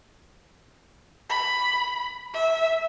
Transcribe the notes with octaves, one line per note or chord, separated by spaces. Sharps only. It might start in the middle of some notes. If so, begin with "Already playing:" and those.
B5
E5